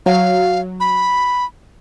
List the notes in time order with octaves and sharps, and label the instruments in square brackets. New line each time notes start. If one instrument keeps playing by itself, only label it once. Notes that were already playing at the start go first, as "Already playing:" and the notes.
[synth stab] F#3 [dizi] F5
[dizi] B5